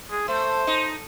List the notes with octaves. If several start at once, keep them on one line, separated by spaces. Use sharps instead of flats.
G#4
A3 C5
D#4